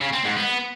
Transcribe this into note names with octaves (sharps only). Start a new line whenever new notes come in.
C#3
C4
G#2
B3